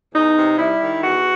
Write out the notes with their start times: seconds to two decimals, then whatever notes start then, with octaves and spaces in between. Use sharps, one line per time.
0.15 E2 D#4
0.37 C3
0.59 G3 E4
0.81 D#3
1.03 E2 F#4